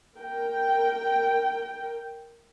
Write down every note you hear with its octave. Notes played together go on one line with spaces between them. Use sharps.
A#4 G5